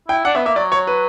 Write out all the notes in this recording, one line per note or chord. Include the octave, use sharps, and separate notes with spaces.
E4 G5
D4 F#5
B3 E5
A#3 E5
F#3 D5
C#5
B4